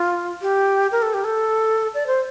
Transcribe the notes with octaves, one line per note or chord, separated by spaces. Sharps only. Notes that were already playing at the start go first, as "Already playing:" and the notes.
Already playing: F4
G4
A#4
A4
G4
A4
D5
C5